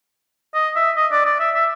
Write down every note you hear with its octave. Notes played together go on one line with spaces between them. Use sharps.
D#5
E5
D#5
D5
D5
E5
E5